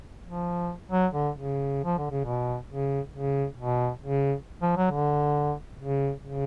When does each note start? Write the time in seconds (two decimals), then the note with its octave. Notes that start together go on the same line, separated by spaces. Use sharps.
0.25 F3
0.91 F#3
1.14 D3
1.36 C#3
1.84 F3
1.98 D3
2.11 C#3
2.25 B2
2.69 C#3
3.14 C#3
3.58 B2
4.02 C#3
4.62 F3
4.77 F#3
4.91 D3
5.80 C#3
6.25 C#3